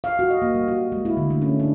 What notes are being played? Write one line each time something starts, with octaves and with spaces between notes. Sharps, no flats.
F5
F#4
D#5
A#3
G3
F#4
G#3
E4
D3
A3
C#4
D4